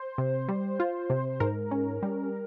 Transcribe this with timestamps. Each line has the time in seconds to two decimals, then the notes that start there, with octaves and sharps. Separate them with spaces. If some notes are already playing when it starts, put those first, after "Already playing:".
Already playing: C5
0.18 C3
0.49 G3
0.80 F4
1.10 C3
1.40 G#2 A#4
1.71 C#4
2.03 G3